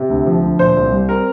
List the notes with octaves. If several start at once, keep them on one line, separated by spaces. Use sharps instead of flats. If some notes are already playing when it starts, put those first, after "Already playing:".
Already playing: C3
D2
F3
D2
A#2 C5
C2
G3
C4 A#4